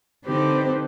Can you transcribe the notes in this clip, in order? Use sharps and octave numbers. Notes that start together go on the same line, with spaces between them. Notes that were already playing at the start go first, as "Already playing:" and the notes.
D3 C4 D#4 G4 B4 C5